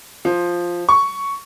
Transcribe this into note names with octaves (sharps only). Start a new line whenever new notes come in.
F3
C#6